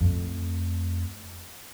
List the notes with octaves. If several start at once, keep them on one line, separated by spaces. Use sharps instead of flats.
F2 A3